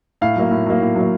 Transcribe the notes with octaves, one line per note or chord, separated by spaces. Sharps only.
A2 F5
F#3 A#3
A2
F#3 A#3
A2
F#3 A#3